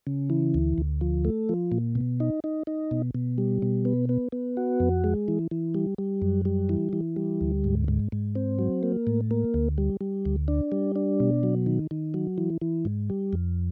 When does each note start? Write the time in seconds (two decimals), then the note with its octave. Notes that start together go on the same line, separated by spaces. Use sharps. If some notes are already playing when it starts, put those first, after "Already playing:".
0.07 C#3
0.30 E3
0.54 D2
0.78 D2
1.01 F3
1.25 A3
1.49 F3
1.72 A#2
1.95 B2
2.20 D#4
2.44 D#4
2.67 D#4
2.91 B2
3.15 B2
3.38 G3
3.62 B2
3.85 B3
4.09 B3
4.32 B3
4.57 F#4
4.80 F2
5.04 G#3
5.28 E3
5.51 E3
5.74 G3
5.98 G3
6.22 F#2
6.45 G3
6.69 E3
6.93 E3
7.16 G3
7.41 D2
7.64 G#2
7.88 G#2
8.12 G#2
8.35 C4
8.59 F#3
8.83 A#3
9.07 A2
9.31 A#3
9.54 D2
9.78 G3
10.01 G3
10.25 D2
10.48 D4
10.72 G3
10.96 D4
11.20 B2
11.43 F#3
11.66 D#3
11.91 D#3
12.14 F#3
12.38 E3
12.61 E3
12.85 G#2
13.10 G3
13.33 F2